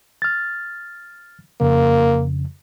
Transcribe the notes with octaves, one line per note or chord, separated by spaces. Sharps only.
F6 A6
F2 C#3 A#3